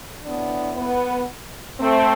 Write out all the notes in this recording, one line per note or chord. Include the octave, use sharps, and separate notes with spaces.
A2 E3 B3 D4
B3
A3 C4